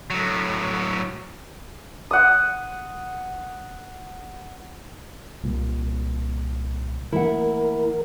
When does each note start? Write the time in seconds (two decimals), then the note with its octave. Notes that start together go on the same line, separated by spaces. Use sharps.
0.10 A2 F#3
2.11 F#5 D#6
5.44 C2 A#2
7.12 E3 A3 A#3 E4 A#4 F#5